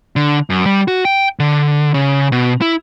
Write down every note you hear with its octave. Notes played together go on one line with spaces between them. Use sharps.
D3
F#2
G3
F#4
G5
D3
C#3
B2
E4